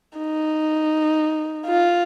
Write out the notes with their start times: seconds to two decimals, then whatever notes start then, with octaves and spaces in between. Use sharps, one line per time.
0.19 D#4
1.67 F4